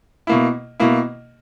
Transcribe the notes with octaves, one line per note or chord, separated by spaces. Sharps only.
B2 A#3 E4
B2 A#3 E4